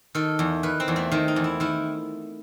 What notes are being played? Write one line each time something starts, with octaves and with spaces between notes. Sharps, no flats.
D#3 A4
E2
D#3 B4
C4
E2
A3
D#3 C4
D#4
E2
E4
D#3 E4